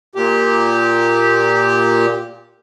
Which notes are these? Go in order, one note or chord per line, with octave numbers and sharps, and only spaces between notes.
A#2 G4